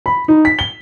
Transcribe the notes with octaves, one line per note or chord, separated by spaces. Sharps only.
B5
D#4
B6
G7